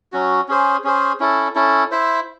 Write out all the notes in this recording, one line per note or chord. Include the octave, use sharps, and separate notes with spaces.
F#3 C#4 F#4
C#4 G#4 C5
C#4 G#4 C5
C#4 E4 A4
C#4 E4 A4
E4 C5 E5